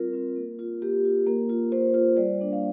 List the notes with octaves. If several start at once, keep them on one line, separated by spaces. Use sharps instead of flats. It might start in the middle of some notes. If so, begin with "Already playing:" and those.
Already playing: G3 C4 F4 A#4
C4 F4
A#3
F4
A#3 G4
F4
A#3 A#4
F4
A#3 C5
F4
G3 D5
A#3 D4
F5